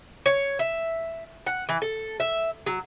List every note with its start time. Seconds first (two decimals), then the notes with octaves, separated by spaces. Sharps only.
0.26 C#5
0.59 E5
1.46 F#5
1.69 E3
1.82 A4
2.20 E5
2.66 F#3